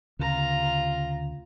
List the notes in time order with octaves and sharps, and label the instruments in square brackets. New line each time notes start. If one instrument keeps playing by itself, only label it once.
[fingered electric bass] D2 C#3 [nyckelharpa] F4 A#5